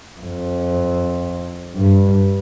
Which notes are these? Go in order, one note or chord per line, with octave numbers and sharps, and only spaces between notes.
F2
G2